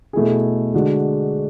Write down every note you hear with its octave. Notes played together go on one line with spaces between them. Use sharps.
B2 A3 E4 G#4
D3 G#3 D4 F#4